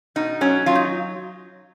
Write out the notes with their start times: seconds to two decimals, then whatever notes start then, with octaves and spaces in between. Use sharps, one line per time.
0.16 B2 D#4
0.41 F#3 C#4
0.66 F#3 F4
0.75 D#4